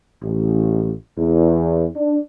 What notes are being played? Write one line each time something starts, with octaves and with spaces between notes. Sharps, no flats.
A1
E2
D4